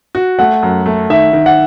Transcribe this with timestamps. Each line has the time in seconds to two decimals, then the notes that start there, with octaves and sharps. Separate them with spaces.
0.15 F#4
0.39 A3 F#5
0.63 F#2
0.86 A3
1.10 D#3 E5
1.33 D#3
1.46 F#5